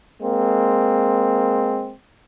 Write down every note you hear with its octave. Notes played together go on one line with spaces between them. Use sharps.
G#3 A#3 C4